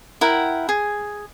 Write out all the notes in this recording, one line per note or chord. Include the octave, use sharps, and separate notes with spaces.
E4 A#4 F#5 G5
G#4